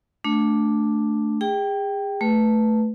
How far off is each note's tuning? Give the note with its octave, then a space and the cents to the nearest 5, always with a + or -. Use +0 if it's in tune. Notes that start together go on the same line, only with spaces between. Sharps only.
A3 +0 D4 +0
G#4 -35 G5 -5
A3 +0 B4 +0